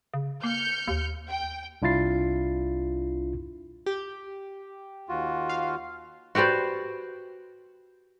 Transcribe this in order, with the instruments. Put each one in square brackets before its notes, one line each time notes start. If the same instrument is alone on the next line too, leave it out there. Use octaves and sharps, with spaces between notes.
[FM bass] C#3
[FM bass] A#3 [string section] F6 G6 C#7
[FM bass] D#2
[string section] G5
[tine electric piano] C2 D4 E4 F4 A6 C7
[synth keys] G4
[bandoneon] D#2 F4 F#4
[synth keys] F5
[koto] F#4 G4 B4 C5 D5